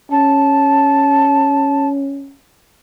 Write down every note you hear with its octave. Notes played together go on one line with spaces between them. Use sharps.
C#4 A5